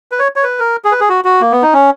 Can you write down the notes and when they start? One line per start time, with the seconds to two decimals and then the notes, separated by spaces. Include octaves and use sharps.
0.12 B4
0.19 C#5
0.36 C#5
0.43 B4
0.59 A#4
0.85 G#4
0.92 B4
1.00 G#4
1.09 F#4
1.25 F#4
1.41 A#3
1.52 B3
1.62 D#4
1.73 C#4